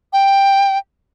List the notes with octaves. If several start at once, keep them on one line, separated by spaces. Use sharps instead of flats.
G5